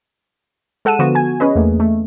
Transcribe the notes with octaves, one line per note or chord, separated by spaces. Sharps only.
G#3 A4 F#5 A5 D#7 E7
D3 F3 B3 F#4
G#5 G#6
C#4 G#4 B4 D#5
E2 A3 A#3
A3